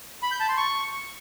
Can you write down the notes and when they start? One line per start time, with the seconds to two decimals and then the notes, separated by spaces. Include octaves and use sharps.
0.23 B5
0.31 G6
0.40 A5
0.48 C6
0.57 C#6